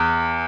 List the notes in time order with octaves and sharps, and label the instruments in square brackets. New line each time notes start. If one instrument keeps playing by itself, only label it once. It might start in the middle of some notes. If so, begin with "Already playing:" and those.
Already playing: [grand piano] E2